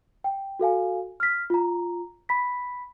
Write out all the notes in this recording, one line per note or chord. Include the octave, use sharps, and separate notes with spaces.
G5
F#4 A4 F5 G#5
F6 B6
F4 A#5
B5 B6